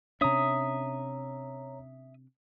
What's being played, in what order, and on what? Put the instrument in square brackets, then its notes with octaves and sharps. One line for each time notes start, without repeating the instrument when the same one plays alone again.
[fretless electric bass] C3 C#4 D4 [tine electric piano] C#5 A#5 [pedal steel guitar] E5 D#6